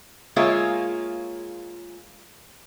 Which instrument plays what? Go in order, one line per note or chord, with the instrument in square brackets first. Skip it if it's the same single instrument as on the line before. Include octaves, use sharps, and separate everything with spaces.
[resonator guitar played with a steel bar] G#3 A#3 F4 G#4 C#5 E5